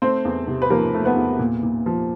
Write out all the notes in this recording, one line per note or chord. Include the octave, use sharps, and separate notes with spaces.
A3 C4 C5
E2
C3
B4
F3 A#3 A#4
A3
B3 B4
E2
A#2
A#2
F3